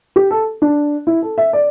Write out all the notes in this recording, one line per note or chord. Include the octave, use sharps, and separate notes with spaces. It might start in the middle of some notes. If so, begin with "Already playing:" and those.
G4
A4
D4
E4
A4
E5
D5